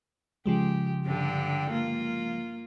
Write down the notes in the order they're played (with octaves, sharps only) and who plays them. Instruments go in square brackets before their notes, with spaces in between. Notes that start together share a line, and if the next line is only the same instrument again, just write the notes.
[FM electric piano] C#3 F3 G#3 [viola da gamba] G4
[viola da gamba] G2 D3 G4
A#3 F4